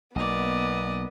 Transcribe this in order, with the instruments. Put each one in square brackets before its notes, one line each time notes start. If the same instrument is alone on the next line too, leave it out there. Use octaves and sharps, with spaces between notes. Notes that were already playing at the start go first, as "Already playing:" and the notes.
[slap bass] B1 [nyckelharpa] A#3 D5 [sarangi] B3 [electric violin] D#5